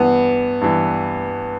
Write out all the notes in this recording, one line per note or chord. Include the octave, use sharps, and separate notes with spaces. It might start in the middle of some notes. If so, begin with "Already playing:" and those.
Already playing: G2 E3 B3
G2 E3